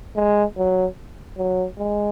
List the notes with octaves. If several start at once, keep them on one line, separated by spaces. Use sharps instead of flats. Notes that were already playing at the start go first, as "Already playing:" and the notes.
G#3
F#3
F#3
G#3